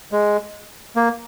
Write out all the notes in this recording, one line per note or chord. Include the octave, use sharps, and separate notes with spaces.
G#3
A#3